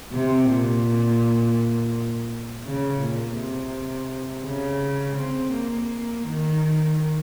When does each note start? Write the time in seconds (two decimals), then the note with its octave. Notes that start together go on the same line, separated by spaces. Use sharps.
0.12 C3
0.49 A#2
2.64 C#3
3.00 A#2
3.36 C3
4.44 C#3
5.16 C4
5.52 A#3
6.24 D#3